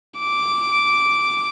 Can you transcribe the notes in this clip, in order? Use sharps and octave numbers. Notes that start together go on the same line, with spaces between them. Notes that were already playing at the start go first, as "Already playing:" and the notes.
D6